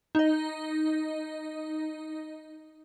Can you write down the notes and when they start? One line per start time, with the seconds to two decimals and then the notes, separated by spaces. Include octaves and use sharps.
0.15 D#4 D#5